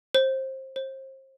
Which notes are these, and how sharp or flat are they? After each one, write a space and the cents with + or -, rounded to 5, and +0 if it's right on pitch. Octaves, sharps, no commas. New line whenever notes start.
C5 +25
C5 +35